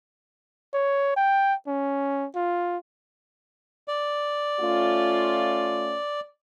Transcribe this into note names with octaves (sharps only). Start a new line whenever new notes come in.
C#5
G5
C#4
F4
D5
A3 C#4 F4